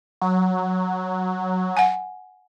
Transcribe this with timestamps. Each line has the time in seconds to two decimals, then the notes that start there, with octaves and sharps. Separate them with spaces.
0.21 F#3
1.77 F#5 G#5